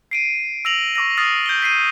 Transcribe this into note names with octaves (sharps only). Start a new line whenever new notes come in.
C7 D7 D#7
E6 A#6 F7 F#7
C#6 D6 E6 A#6
D#6 F6 A6 C7 D#7
G6 D7 G7
B6 C7 D#7